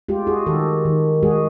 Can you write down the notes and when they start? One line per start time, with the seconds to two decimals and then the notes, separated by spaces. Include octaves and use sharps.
0.09 G#3 F4 G4
0.27 F#4 G#4
0.46 D#3 G4 A4
0.85 D#3
1.23 G#3 F#4 G#4